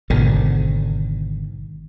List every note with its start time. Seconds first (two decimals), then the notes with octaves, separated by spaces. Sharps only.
0.10 G#1 B2 D3 D#3